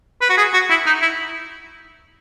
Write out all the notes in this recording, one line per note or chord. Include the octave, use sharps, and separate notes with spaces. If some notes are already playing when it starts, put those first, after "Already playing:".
B4
F#4
G#4
F#4
E4
D#4
E4